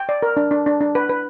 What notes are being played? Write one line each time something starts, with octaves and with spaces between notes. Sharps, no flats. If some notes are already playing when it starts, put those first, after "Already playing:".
Already playing: G5
D5
A#4
D4
D4
D4
D4
B4
B4